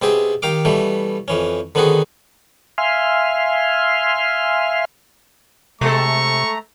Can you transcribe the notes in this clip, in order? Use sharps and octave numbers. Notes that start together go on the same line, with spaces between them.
B2 C4 G4 G#4 E5
D#3 G4 F5 D6
B2 E3 G3 A3
F2 E3 C#4
D3 D#3 B3 C4 F#4 G#4
E5 F5 G#5 C6 F6
C3 G#3 A3 A4 A#5 C#6